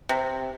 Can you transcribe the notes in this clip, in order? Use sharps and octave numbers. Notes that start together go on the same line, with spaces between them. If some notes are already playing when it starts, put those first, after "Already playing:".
C3